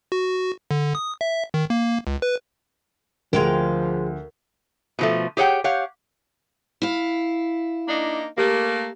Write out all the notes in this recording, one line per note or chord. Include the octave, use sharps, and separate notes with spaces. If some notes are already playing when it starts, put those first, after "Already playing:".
F#4
D3
D#6
E5
D#3
A#3
C#2
B4
D2 F3 G#3 A#4 F5 G5
B2 F3 A3
G4 G#4 C#5 F#5 G5
G4 C#5 F5 F#5
E4 F5
A#3 D4 D#4
A3 A#3 G4